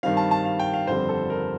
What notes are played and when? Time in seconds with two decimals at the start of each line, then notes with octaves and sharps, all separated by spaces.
0.03 G2 D#3 G3 C4 F5
0.17 A5
0.31 A5
0.45 F5
0.59 G5
0.74 F5
0.87 G1 F2 D3 G3 C4 C5
1.09 A4
1.30 A#4